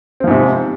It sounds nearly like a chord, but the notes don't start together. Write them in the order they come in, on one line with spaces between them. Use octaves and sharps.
C4 F3 G#2 C3